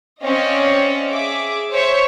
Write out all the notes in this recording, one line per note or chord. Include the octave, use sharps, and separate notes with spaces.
C4 C#4 D5 D#5 F5
G#4 E5 D6
C5 C#5 E5 C#6